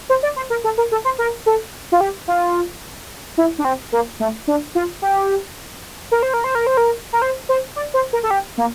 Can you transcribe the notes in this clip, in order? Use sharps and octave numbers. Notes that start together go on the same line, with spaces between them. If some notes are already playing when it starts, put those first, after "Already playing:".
C5
D5
C5
A#4
A4
A#4
A4
C5
A#4
A4
F4
G4
F4
E4
D4
C4
A#3
A3
D4
F4
G4
A#4
C5
A#4
C5
A#4
C5
A#4
A#4
C5
C5
D5
C5
A#4
A4
G4
A#3